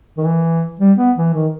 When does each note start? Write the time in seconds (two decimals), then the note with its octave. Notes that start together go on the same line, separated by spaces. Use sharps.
0.17 D#3
0.24 E3
0.79 G3
0.98 B3
1.17 E3
1.34 D#3